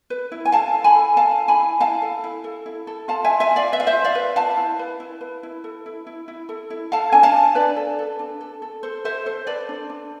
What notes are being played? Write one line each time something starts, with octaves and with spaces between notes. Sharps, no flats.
B4
E4
G#5
A4 F5 A5
E4
G#5 B5
A4
A4 F5 A5
E4
G#5 B5
E4
E4 F5 A5
A4
E4
A4
E4
A4
F4 F5 A5
E5 G#5
F4
E5 G#5
F4
D5 F5
B4 E5
F5
C5 E5
F4
D5 F5
B4
B4 F5 A5
E4
B4
E4
B4
E4
A4
E4
E4
E4
A4
E4
A4 F5 A5
D4 G#5
F5 A5
D4
D4 B4 D5
A4
A4
D4
A4
A4
A4 C5
A4 C5 E5
A4 C5
A4 B4 D5
D4
D4